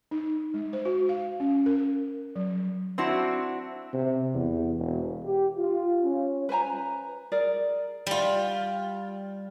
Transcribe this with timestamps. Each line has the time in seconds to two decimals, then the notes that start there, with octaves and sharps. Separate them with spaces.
0.11 D#4
0.54 G#3
0.73 C5
0.85 F#4
1.09 F5
1.40 C#4
1.66 A#4
2.36 F#3
2.98 C4 D4 E4 F#4
3.93 C3
4.34 E2
4.79 E1
5.24 G4
5.57 F4
6.02 C#4
6.49 B4 C5 G#5 A#5
7.32 G#4 A#4 D5
8.07 G3 F4